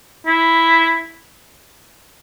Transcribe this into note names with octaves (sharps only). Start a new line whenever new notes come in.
E4